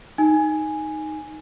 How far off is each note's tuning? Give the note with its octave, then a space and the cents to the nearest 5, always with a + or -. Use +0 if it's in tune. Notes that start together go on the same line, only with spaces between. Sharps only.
D#4 +0 G#5 +0